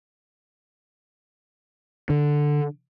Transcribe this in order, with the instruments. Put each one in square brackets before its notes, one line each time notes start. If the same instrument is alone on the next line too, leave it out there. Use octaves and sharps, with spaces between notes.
[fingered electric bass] D3